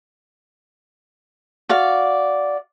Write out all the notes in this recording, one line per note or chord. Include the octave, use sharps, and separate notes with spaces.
F#4 D5 F5